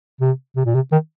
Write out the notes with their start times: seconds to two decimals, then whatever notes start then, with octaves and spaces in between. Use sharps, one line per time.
0.21 C3
0.56 C3
0.66 A#2
0.75 C3
0.92 D#3